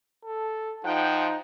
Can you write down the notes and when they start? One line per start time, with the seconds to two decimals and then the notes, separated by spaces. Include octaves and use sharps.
0.25 A4
0.85 F3 D#4 F#5 G5